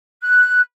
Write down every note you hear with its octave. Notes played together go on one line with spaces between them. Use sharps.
F#6